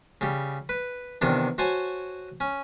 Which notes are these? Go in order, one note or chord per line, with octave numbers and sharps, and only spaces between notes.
C#3 G3
B4
E2 C3 D#3 D4
F#4 C5 C#5 G#5 A5
C#4